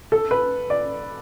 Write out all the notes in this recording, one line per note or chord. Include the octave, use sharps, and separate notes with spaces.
A4
B4
D5